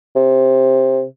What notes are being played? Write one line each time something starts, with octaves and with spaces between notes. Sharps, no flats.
C3